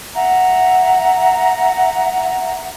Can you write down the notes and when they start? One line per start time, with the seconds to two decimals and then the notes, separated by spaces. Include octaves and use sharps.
0.14 E5 F#5 A#5